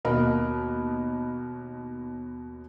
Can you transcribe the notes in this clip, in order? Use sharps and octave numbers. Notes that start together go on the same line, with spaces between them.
D#2 B2 A#4 D#5 B5